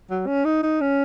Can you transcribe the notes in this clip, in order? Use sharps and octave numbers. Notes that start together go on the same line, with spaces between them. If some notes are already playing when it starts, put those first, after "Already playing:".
F#3
C#4
D#4
D#4
C#4